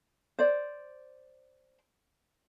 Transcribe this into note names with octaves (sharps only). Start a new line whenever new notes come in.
C5 D5